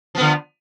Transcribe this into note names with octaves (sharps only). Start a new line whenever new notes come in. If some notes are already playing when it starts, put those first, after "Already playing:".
D3 F3 B3